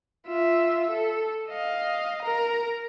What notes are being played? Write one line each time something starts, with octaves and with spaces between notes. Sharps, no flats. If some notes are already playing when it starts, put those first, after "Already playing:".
F4 E5
A4
D#5 F5
A#4 A#5